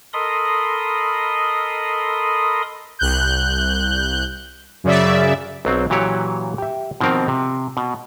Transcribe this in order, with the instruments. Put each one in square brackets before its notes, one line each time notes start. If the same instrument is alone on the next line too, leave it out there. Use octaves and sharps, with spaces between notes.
[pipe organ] A4 A#4 D#5 B5 C6 D#6
[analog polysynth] C2 F#6 G6
F#2 C#3 D5 E5
[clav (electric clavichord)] B1 F#3 C4
A#2 E3 F#3 G4 C#5
G4 E5
B2 D#3 F3 C4 A#4
C3
B2